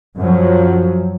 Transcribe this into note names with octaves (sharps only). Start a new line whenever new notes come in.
F#2 F3 F#3